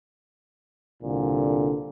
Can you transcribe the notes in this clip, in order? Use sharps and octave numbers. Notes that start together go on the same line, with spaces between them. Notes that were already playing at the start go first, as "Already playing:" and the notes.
C2 A#2 D3